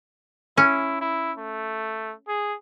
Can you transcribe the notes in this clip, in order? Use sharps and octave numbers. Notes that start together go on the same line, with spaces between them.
C#4 E4
E4
A3
G#4